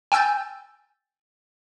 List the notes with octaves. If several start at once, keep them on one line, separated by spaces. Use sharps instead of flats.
G5 G#5 E6 G6 A6